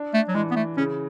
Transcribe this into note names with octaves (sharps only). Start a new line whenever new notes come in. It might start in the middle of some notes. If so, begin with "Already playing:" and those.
Already playing: D4
A3
F#3
E3 G#3
B3
A3
C#3 C#4